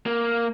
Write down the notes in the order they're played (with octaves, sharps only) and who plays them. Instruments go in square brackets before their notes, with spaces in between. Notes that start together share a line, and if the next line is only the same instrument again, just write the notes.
[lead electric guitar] A#3